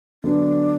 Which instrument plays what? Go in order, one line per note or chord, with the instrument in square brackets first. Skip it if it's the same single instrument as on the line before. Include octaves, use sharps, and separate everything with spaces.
[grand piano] D3 F#3 B3 [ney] D4